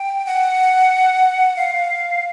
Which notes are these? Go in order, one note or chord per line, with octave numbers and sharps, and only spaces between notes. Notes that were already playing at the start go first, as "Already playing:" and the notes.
Already playing: G5
F#5
F5